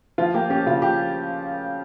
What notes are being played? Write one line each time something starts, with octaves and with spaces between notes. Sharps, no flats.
F3 F4
A#3 G4
C#4 G4
C#3 F4
F3 G4